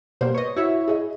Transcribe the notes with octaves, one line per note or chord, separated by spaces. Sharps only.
B2 G3 A#3 C5
B4 C#5 D#5
E4 F#4 C#5 E5
G#4 D#5